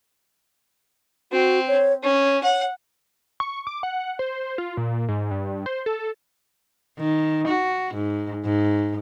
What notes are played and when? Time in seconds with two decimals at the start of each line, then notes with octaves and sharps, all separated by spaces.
1.32 C4 F#4
1.68 C#5
2.03 C#4 C#5
2.43 C#5 F#5
3.40 C#6
3.67 D6
3.83 F#5
4.19 C5
4.58 F4
4.77 A#2
5.08 G#2
5.31 G2
5.66 C5
5.86 A4
6.99 D#3
7.48 F#4
7.94 G#2
8.45 G#2